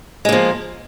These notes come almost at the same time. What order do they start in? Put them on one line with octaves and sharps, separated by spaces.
G#3 A#3 F3